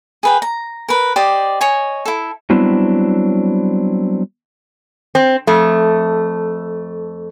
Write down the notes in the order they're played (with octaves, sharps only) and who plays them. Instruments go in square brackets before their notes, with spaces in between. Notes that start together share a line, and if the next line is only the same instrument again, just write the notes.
[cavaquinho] G#4 B4 G5
A#5
A#4 B4
G4 C5 D5 D#5
C#5 D#5 G#5
E4 A4
[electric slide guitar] F#3 G3 B3 C4 D4 E4
[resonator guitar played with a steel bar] C4
F2 A3